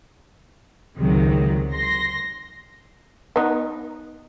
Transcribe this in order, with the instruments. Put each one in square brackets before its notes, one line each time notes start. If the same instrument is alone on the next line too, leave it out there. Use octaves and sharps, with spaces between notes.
[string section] C#2 C3 D#3 F#3 G#3
C6 A#6
[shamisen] B3 D#4